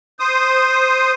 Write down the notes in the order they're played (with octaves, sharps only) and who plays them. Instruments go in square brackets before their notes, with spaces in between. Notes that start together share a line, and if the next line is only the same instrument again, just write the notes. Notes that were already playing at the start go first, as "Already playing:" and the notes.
[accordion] C5 D#6